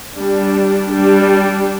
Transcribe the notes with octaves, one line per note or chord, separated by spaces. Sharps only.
G3 D4
G3 D4